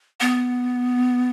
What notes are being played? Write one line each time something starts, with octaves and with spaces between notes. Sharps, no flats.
B3